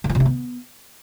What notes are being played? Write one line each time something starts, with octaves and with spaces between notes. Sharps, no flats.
D3
F3
C3
E4
B3